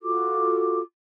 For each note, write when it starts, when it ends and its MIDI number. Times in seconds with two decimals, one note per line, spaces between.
0.02 0.81 65
0.02 0.81 66
0.02 0.81 69
0.02 0.81 86